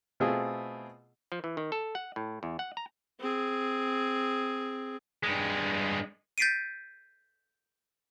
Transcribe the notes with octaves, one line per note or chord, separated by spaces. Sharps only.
B2 A3 B3 C4 F4 G#4
F3
E3
D#3
A4
F#5
A2
E2
F#5
A#5
C4 G#4
G2 G#3
G6 A6 B6 C7 D7 D#7